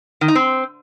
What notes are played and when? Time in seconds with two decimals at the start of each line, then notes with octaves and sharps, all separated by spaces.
0.21 D#3
0.28 D#4
0.35 C4